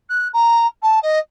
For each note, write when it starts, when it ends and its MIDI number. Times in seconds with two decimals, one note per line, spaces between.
0.09 0.28 90
0.33 0.66 82
0.82 0.99 81
1.02 1.19 75